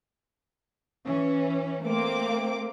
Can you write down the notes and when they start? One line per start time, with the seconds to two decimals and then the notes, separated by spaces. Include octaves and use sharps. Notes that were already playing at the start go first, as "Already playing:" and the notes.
1.05 E3 C#4
1.83 A3 A#3 C4 D6